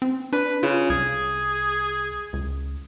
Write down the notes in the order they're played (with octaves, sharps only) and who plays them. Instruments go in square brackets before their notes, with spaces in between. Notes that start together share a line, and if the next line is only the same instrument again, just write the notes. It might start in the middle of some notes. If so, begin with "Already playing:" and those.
[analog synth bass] C4
[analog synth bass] D4 [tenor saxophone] B4
[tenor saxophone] C#3 [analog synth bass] F4
[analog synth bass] C2 [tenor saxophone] G#4
[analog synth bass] C#2